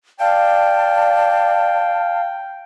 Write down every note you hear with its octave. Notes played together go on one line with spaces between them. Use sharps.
D5 F5 G5 A5